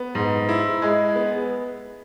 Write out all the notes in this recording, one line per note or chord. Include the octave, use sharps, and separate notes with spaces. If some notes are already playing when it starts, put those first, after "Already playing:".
Already playing: B3
G#2
E4
G#3
B3